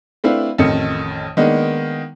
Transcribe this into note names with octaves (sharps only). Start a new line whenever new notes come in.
A3 C4 D4 E4 B4 F5
A1 F2 D#3 A3 D#4 C#7
D#3 G#3 A#3 B3 D4 D#4